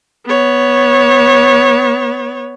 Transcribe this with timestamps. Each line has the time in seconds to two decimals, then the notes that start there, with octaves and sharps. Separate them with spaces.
0.26 B3 C#5